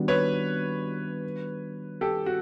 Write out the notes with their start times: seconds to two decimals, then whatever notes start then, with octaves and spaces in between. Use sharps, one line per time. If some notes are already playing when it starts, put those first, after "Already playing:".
Already playing: D#3 G3 B3 D4 F#4
0.08 B4 C#5
2.01 G4 A4
2.26 F#4